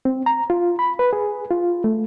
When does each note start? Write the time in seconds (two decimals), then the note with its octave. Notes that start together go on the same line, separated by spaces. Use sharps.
0.05 C4
0.26 A#5
0.50 F4
0.79 B5
0.99 B4
1.13 G#4
1.51 F4
1.84 A3